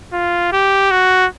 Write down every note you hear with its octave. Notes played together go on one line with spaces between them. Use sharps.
F4
G4
F#4